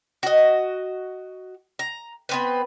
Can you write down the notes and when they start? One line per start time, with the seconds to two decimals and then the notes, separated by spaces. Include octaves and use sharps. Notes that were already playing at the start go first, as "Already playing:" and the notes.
0.23 F#4 D#5
1.79 A#5
2.29 B3 C4 B4